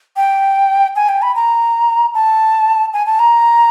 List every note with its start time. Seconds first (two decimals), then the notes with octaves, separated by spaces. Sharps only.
0.16 G5
0.96 G#5
1.09 G5
1.22 B5
1.35 A#5
2.14 A5
2.93 G#5
3.06 A5
3.19 A#5